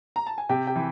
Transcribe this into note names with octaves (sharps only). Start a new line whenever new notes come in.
A#5
A5
G#5
C3 G4 G5
G4 G5
E3